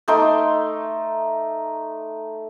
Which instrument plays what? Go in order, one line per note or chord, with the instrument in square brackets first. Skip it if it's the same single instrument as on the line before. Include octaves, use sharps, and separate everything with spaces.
[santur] A3 D#4 C6 D6